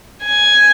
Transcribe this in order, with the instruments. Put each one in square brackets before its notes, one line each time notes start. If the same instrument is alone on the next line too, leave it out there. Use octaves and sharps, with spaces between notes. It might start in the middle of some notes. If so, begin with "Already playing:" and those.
[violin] G#5